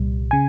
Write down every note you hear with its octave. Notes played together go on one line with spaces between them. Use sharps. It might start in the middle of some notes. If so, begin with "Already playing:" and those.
Already playing: C2 A#2 G3
C#3 G#5